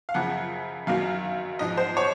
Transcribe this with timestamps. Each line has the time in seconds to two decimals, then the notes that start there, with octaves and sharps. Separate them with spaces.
0.09 F5
0.14 F#2 C#3 F3 F#5
0.87 F#2 D#3 F#3 F5
1.59 G#2 F3 D#5
1.77 C5
1.97 C#5